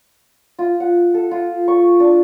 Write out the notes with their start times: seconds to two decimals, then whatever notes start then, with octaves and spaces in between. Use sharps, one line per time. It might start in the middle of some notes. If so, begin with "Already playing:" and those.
0.59 F4
0.80 F#5
1.14 A4
1.31 F4
1.68 C#6
2.00 D4